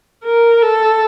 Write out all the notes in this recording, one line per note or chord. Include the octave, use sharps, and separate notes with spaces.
A#4
A4